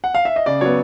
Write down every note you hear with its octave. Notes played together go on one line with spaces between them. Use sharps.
F#5
F5
E5
D#5
C#3 D5
F#3 B3 C#5